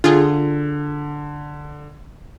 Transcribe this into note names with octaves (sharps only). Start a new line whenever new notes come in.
D3 F4 G#4